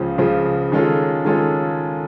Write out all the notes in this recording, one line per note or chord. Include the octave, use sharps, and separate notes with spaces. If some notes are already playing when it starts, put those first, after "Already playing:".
Already playing: C#2 C#3 F3
C#2 C#3 F3
D#3 G#3 C#4 F4 A4
D#3 G#3 C#4 F4 A4